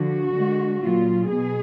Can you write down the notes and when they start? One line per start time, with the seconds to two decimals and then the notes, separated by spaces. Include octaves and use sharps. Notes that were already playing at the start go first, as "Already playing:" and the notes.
Already playing: D3 F3 F#4
0.35 D3 G#3
0.81 A#2 F#3 F4
1.30 B2 G#4